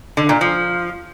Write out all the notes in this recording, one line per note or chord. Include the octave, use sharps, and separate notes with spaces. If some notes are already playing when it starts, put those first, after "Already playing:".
D3
A#2
F3